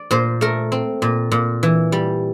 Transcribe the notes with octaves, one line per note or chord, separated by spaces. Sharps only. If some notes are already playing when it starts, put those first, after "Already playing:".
Already playing: D5
A#2 C5
A3 A#4
C4
A#2
A#2
E3
G3